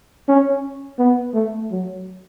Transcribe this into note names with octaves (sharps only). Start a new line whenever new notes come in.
C#4
B3
A3
F#3